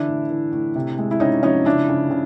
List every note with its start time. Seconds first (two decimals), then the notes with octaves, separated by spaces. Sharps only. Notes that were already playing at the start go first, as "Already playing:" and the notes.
Already playing: D3 E3 D4 E4
0.08 A2
0.30 E3
0.52 A2
0.75 C3
0.99 G#3
1.11 E4
1.20 C3 C#4 D#4
1.43 F3 C#4 D#4
1.65 C#3 D4 E4
1.89 C#3
2.10 C#3